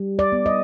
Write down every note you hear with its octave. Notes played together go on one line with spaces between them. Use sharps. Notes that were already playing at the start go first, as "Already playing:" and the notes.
Already playing: G3
D5
B3
D#5